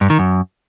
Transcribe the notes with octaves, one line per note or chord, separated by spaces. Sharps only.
G2
D#3
F#2